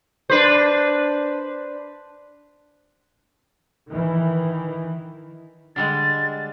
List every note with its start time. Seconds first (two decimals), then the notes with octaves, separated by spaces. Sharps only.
0.30 D4 B4 C5
3.89 D#3 E3
5.76 D3 G3 G#3 A6